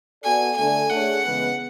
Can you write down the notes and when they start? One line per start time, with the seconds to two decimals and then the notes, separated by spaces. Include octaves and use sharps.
0.24 B3 F#4 A4 D5 G#5
0.57 D3 A3 D4 A4 D5 G#5
0.90 A3 D4 G#4 C#5 F#5
1.24 C#3 E3 G#3 B3